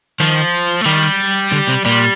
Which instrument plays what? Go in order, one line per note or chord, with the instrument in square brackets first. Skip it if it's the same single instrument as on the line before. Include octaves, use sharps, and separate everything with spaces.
[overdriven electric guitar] D#3 [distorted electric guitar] F3
[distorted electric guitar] A3
[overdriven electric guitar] D#3 [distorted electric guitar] G3
[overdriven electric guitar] D3
C3
[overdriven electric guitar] A#2 [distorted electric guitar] G3